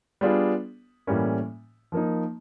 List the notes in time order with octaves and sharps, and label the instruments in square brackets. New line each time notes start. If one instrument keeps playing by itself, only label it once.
[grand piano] G3 B3 D4 F4 G#4
A2 E3 G3 A#3 C#4
F3 A#3 D#4